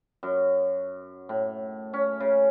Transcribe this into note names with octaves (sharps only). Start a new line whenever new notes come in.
F#2
A2
C#4
C#3